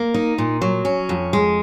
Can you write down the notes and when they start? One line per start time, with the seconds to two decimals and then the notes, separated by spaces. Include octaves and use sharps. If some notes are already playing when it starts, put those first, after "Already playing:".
Already playing: A#3
0.14 D#4
0.38 A#2
0.62 F#3
0.85 C#4
1.09 F2
1.33 G#3